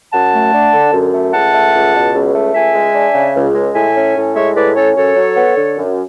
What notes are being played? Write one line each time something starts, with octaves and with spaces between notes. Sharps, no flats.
F#2 F#5 A5
A3
D4
D3
F#2
A3
C#2 F#5 A5
A3
C#2
B2
C#2
A3
C#2 E5 G#5
G#3
D4
C#3
C#2
G#3
A2 E5 G#5
C#4
A2
G#3 C#5 E5
A2 B4 D5
C#4 A4 C#5
F#2 A4 C#5
F#3
B3
D3
F#2